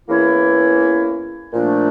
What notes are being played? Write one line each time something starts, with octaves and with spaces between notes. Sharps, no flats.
E2 E3 A#3 C#4 E4
A#2 F3 A3 D4